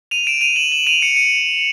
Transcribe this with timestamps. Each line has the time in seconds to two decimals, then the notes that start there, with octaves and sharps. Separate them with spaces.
0.11 D#7 F7
0.27 D7 E7
0.41 D#7 F7
0.56 E7 F#7
0.72 E7 F#7
0.87 D#7 F7
1.01 C#7 D#7
1.16 C#7 D#7